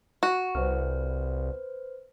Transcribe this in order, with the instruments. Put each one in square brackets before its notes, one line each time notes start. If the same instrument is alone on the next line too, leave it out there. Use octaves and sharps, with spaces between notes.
[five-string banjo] F#4 [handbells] C#6
[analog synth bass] C2 [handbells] B4 C5 F6